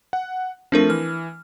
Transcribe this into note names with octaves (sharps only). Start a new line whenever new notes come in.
F#5
F3 A3 C4 D4 A#4
E3 F6